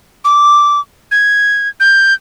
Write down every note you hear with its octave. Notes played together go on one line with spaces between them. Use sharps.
D6
G#6
G6